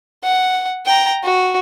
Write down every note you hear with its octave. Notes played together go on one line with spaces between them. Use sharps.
F#5
G5 A#5
F#4